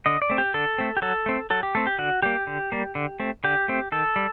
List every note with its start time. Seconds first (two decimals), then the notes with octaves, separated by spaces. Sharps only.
0.06 D3 D#5
0.22 D5
0.30 A3 C4
0.38 G4
0.54 D3 A4
0.78 A3 C4
0.97 G4
1.02 F#3 A4
1.26 A3 C4
1.50 F#3 A4
1.63 G4
1.75 A3 C4 A4
1.87 G4
1.99 D3 F#4
2.22 G3 A#3 G4
2.47 D3
2.72 G3 A#3
2.95 D3
3.20 A3 C4
3.44 D3 G4
3.68 A3 C4
3.92 D#3 A4
4.16 G3